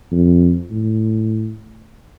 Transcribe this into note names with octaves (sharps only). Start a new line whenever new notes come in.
F2
A2